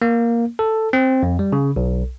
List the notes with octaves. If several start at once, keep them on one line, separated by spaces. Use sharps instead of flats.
A#3
A4
C4
F2
G3
C#3
B1